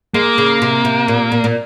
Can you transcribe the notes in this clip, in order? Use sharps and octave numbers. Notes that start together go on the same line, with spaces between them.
G#3 A#3
C#3
C3
C3
A#2
A#2
A#2